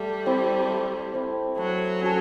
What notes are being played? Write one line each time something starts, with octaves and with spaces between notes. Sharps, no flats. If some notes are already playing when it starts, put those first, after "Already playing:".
Already playing: G3 A3
C4 E4
A3
C4 E4
F#3 A3
C#4 F#4 A4